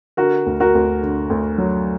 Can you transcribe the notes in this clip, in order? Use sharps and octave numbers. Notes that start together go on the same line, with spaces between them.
D3 F#4 A#4
D2
F#4 A#4
D2
D3
D2
F#3